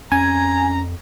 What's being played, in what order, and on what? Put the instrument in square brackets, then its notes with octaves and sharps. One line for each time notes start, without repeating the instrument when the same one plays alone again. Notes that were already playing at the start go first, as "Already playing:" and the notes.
[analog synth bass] F2 [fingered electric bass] C#4 [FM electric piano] G#5 [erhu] A#5